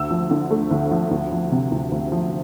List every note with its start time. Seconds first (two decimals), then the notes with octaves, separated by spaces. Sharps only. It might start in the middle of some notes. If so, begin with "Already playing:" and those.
Already playing: D2 E6
0.11 F3
0.31 D3
0.51 A3
0.71 D2
0.91 F3
1.11 D2
1.32 F3
1.52 C3
1.72 D2
1.92 D2
2.12 F3